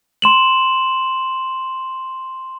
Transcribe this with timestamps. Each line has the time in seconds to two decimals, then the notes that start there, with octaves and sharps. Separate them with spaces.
0.22 C6 E7 F#7